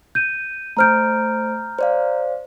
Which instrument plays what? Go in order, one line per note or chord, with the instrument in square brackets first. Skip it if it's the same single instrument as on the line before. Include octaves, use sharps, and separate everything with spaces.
[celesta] G6 D#7
[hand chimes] A3 C5 D7 [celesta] A#5 F6 G6
[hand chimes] C5 D5 F5